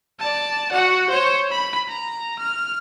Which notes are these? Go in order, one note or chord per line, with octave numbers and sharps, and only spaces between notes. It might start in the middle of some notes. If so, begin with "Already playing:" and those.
D5 A5
F#4 F#5
C5 C#5
B5
A#5
F6